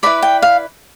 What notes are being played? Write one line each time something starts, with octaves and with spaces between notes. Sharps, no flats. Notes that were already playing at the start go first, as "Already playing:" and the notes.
E4 B4 D5 B5
G5
F5